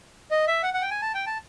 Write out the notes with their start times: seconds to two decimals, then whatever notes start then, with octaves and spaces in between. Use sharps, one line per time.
0.31 D#5
0.47 E5
0.63 F#5
0.74 F#5
0.81 G5
0.91 G#5
1.02 A5
1.14 G5
1.27 A5